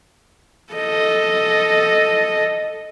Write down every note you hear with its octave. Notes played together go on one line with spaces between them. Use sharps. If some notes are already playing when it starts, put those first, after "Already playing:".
A4 D#5